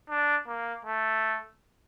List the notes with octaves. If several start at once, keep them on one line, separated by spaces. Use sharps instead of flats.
D4
A#3
A3